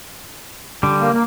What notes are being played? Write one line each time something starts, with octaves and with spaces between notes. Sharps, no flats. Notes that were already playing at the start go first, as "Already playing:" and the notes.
D3 G3
A#3
A#3